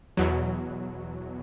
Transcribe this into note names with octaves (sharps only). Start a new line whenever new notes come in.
E2 B2 F#3